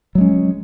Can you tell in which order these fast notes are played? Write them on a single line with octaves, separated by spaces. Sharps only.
F#3 G#3 C#4